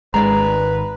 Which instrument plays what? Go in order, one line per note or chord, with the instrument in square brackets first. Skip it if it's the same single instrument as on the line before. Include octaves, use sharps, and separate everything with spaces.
[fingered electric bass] G#1 D#3 [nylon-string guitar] G#3 C#4 D5 [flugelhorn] B4 [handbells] A#5